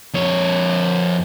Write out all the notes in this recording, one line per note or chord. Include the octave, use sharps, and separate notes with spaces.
F2 C#5